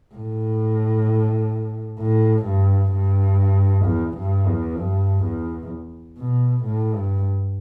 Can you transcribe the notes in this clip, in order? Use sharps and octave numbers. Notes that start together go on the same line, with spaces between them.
A2
A2
G2
G2
E2
G2
E2
G2
E2
B2
A2
G2